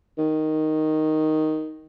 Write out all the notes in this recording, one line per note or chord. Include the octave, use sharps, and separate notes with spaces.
D#3